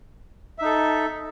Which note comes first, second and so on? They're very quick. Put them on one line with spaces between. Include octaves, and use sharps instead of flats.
E5 D#4 A4